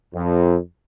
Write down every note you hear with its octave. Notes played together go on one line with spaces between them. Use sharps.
F2